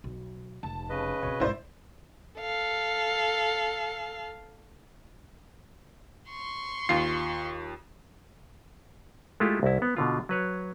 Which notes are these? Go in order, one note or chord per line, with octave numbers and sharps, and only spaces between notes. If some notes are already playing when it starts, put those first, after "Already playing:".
B1
F1 A5
C#3 B4 D#5
B2 C4 C#5
B1 G#2 E4 C5 D5
A4 F5
C6 C#6
D#2 F4 C7
G#3 A3 E4 F4 G4 A4
C2 E4
B3
B2 D3 F4
F#3 B4 C#5